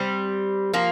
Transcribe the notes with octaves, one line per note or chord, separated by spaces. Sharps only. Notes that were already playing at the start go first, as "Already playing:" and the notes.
Already playing: G3 C4
F3 A#3